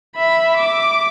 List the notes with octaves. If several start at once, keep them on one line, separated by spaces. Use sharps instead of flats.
E5 B5
D6